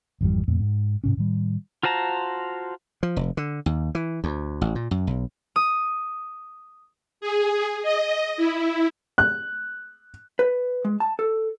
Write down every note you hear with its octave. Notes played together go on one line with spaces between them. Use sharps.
G#1 F2 E3 G3
F2 A#2 A3
G#2
G#2 C3 C#4
A2 D#3 G3
F4 F#4 C5 A5 A#5
F3
F1
D3
D#2
E3
D2
A1
A#2
F#2
B1
D#6
G#4
D#5
E4
F#6
B4
G#3
A5
A4